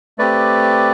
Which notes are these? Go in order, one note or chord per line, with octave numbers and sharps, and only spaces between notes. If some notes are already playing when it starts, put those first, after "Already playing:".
A3 C4 G4 B4 D5